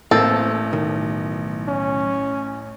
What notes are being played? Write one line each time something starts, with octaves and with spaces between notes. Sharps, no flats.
A1 A#3 C4 A4 G6
B1 D#3
C#4